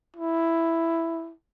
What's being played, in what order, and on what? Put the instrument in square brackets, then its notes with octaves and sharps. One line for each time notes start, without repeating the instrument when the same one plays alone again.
[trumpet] E4